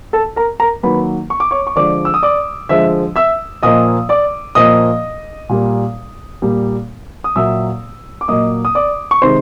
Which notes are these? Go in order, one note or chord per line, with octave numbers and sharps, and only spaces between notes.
A4 A5
A#4 A#5
A#4 A#5
D#3 F#3 A#3 B4 B5
C#6
D6
C#5 C#6
C#6
D3 F3 G#3 D5 D6
E6
D#6
D5 D6
D3 F3 G#3 E5 E6
E5 E6
A#2 F3 A#3 D#5 D#6
D5 D6
A#2 F3 A#3 D#5 D#6
A#2 G3 A#3
A#2 G3 A#3
D#6
A#2 F#3 A#3 E5 E6
D6
A#2 F#3 A#3 D#5 D#6
D#6
D5 D6
C#6
C3 D#3 G#3 C5 C6